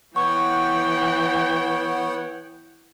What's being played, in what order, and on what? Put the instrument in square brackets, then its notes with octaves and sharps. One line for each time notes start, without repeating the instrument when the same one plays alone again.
[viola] E3 G5 [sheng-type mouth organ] B3 C#5 F#5 [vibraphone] C#6